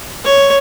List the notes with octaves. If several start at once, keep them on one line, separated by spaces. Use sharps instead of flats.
C#5